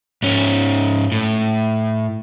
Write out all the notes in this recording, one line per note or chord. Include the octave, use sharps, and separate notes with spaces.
G#2 C#4
A2